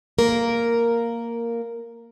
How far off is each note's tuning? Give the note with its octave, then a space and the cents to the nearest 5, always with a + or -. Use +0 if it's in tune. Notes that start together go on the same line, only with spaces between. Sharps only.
A#3 -5 A#4 +0